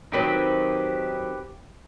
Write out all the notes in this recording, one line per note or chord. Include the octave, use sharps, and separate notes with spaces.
D#3 F#3 C4 G4 B4